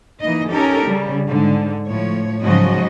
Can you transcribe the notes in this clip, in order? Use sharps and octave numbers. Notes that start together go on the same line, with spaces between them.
E3 A#3 D#4 D#5
C#4 D#4 G4 A4 A#4
C#3 G3
G#2 D3
A2 F3 C#5
G#2 C#3 F3 F#3 F#4 D#5